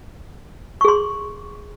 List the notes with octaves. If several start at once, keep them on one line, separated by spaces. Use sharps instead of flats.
G#4 C6 C#6